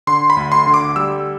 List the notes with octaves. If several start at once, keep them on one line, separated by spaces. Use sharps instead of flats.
D3 C6
B5
D2
C6
D3
D6
G3 E6